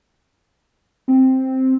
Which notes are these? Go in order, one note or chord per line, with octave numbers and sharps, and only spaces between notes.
C4